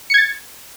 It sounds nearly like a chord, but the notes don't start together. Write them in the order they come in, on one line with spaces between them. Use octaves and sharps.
C#7 G#6 A6